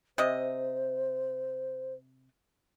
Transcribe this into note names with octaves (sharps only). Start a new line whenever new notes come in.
C3 C5 D#5